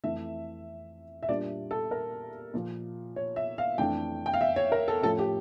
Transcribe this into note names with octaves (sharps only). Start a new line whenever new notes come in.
F2 E3 A3 E5
E5
A#2 G3 A#3 D4 F4 D5
A4
A#4
A#2 F3 A#3
C#5
E5
F5
F2 E3 A3 D4 G5
G5
F5
E5
C#5
A#4
A4
A2 F3 C#4 A4
G4